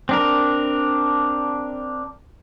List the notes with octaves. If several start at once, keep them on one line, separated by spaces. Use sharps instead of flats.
C4 D4 A#4